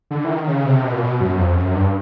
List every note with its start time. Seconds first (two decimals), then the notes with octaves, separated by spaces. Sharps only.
0.11 D3
0.24 E3
0.30 D#3
0.47 C#3
0.65 C3
0.84 B2
0.93 A#2
1.02 B2
1.21 F#2
1.38 F2
1.56 F#2
1.74 G2